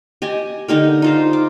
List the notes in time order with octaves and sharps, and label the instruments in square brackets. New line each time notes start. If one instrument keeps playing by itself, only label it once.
[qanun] G4 D#5 G#5
D3 D#4 G4 A#4
D#4 F4 C5
D6